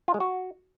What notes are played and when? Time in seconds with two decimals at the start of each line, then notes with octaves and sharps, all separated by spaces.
0.08 F4
0.14 G#3
0.20 F#4